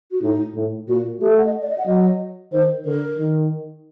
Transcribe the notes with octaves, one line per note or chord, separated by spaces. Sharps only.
F#4
A2 D#4
A2
A#2 F#4
A3 G4
A4
F#5
D#5
D5
D#5
F#5
F#3 D#5
D#3 C5
D3 A#4
D#3